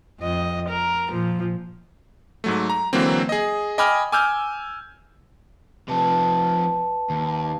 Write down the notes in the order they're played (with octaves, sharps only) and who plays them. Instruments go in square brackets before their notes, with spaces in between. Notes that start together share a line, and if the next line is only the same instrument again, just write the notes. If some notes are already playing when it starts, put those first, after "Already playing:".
[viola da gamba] F2 D#5
A#4
A#2 F3
[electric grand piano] G#2 F#3 A3
A#5
D3 E3 F#3 A#3 C4
G#4 D#5
D#5 G5 G#5 B5 D6 F6
G#5 D6 E6 F6 G6
[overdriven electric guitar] C3 F3 [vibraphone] B4 A5
[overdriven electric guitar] D#2